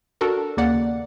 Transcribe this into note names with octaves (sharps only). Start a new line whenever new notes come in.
D4 F#4 A4 A#4
D#2 C#3 A#3 D5 F#5